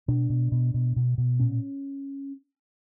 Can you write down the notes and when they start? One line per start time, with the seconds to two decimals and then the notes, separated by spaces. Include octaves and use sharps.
0.08 B2 D4
0.30 B2
0.52 B2
0.74 B2
0.96 B2
1.18 B2
1.40 A#2 C#4